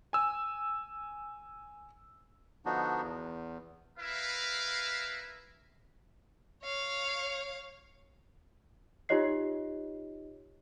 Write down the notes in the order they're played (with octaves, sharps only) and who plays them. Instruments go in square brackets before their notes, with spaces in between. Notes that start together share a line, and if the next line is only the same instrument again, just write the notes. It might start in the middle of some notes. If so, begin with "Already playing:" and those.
[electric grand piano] G#5 E6
[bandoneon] D3 F3 B3 D4 D#4 F#4
E2
[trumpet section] E4 A#4 B4 E5 F5
[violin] C#5 F5
[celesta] D#4 F4 G4 C#5 D#5 C7